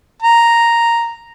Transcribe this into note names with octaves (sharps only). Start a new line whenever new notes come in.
A#5